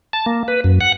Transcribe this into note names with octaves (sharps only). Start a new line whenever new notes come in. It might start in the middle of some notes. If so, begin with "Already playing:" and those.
A5
A#3
B4
F#2
F#5